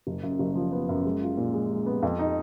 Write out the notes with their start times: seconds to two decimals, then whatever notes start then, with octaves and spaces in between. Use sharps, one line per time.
0.07 F#1
0.23 F#2
0.39 F#1
0.55 F3
0.72 B3
0.89 F#2
1.05 G#3
1.21 F4
1.37 A#2
1.54 G#3
1.70 G#3
1.86 B3
2.03 F2
2.19 D#4